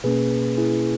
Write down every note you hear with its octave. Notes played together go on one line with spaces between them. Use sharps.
B2 A#3 C#4 G#4 B4
E4 G#4